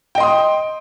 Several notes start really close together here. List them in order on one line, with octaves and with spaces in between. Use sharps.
G5 D#5 C6 D#6